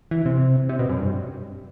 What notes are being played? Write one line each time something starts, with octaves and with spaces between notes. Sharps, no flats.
E3
C3
C3
B2
F#2
G2